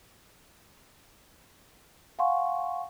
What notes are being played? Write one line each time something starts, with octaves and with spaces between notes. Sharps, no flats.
F5 F#5 G#5 C6 C#6